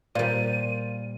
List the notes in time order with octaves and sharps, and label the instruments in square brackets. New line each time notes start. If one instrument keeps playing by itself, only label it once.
[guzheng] A#2 G3 [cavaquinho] F4 [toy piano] A#4 C5 D5 [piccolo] D#7